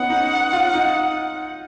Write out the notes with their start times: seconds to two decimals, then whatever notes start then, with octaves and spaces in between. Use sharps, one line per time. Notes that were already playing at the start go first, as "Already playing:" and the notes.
Already playing: B3 C#4 D#4 F#5
0.10 D#4
0.53 F4
0.74 D#4